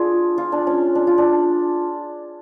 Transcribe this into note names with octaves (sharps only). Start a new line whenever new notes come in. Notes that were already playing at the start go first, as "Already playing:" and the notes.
Already playing: D4 F4 G#4
F4
D4
C#4
D4
F4
D4